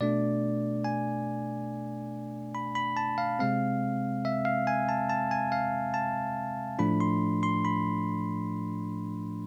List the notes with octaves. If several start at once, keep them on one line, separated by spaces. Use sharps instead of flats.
B2 A3 D4 D5
G#5
B5
B5
A5
F5
C3 G#3 C4 F5
E5
F5
G#5
A5
A5
G#5
F5
A5
A2 F3 A3 D4 B5
C6
C6
B5